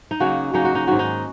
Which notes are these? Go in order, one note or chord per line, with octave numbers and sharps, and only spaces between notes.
D#4
C#3 F#3 A#3 C#4 F#4
C#3 F#3 A#3 C#4 D#4
F#4
D#4
G#2 D#3 F#3 F#4
D#4